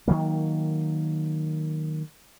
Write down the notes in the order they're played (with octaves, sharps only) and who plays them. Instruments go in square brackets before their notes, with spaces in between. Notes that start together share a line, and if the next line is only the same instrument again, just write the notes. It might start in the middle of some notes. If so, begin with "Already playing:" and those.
[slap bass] D#3 E3 F#3 A#3